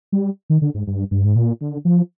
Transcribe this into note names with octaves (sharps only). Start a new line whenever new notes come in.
G3
D#3
D3
G#2
G2
G2
G#2
A#2
D3
F3